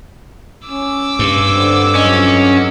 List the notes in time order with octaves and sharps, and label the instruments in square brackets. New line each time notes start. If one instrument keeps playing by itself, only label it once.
[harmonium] C#4 [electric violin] D6 E6
[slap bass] G2
[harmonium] D3 G3 C4
[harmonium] F2 F#3 D#5 [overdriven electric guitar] C#4